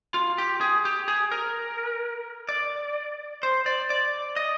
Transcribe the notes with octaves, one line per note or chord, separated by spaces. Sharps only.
F4
G4
G#4
G4
G#4
A#4
D5
C5
D5
D5
D#5